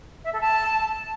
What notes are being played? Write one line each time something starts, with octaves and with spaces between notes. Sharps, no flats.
E5
A4
A5